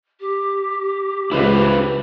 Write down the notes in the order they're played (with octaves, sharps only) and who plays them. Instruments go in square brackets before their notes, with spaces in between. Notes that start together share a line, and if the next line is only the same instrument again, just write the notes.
[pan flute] G4
[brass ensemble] C#2 [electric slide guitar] E4 B4 C5